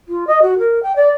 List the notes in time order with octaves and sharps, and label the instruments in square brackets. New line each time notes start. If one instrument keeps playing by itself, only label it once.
[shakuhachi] F4
D#5
F#4
A#4
G5
D5